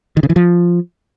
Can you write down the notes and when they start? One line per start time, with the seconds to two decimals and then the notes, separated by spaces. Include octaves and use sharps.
0.17 D#3
0.23 C#3
0.30 E3
0.36 F3